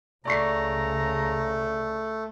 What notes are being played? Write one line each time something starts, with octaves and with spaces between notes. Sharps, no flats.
C#2 C#3 A3 D5 A#5 C#6 C7